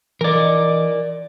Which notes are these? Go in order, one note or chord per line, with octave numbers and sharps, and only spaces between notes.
E3 A#4 D5 D#5